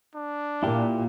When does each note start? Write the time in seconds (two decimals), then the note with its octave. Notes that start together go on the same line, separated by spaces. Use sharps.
0.15 D4
0.63 A#2 E4 G4